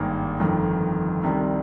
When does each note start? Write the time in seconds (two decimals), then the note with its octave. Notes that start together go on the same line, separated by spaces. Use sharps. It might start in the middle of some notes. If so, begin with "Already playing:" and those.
Already playing: G#1 G2 D#3 A#3
0.40 G1 F2 D#3
1.23 C2 C3 D#3 G3